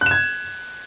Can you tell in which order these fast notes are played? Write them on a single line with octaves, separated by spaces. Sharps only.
F#6 E7 G#6